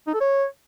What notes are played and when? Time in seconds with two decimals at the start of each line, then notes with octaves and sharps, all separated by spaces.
0.07 D#4
0.14 A4
0.21 C#5